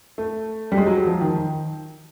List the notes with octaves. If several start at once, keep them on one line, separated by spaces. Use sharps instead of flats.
A3
G3
G#3
F#3
F#3
F3
D#3
D#3